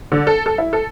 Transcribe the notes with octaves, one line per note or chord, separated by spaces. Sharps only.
D3
A4
A4
E4
A4